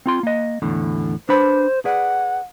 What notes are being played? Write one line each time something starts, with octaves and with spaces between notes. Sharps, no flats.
C4 F4 C6
A#3 D#5
E2 A2 D3
D4 B4 C5 B5
G#4 B4 D5 F#5